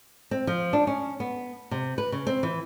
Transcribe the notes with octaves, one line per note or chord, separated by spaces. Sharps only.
C4
F3
D4
C#4
B3
C3
B4
C#3
C4
E3